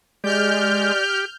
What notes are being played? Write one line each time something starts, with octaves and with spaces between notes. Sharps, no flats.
G#3 G4 D5 F6 G6